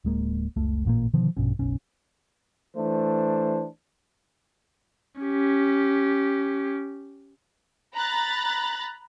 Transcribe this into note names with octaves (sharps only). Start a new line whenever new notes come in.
D1 G#3 A#3
F#1 C#2 A3
A1 A#2 A#3
B2 D3 D#3 F3
A#1 G2 B2 C#4
F#1 B1 C#4
E3 A3 D4 C5
C#4 G4
A#5 B5 F#6 A6